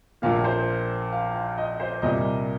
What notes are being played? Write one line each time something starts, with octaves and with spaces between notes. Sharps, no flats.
A#1 A#2 A#3 F5
C5
F5
F5
D#5
C5
C2 A#2 G3 A#3 D#5